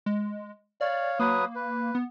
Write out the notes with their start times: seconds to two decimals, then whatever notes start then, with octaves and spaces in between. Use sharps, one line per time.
0.06 G#3
0.81 C#5 D5 F5
1.19 F#3 A#3 B4 D#6
1.55 B4
1.95 B3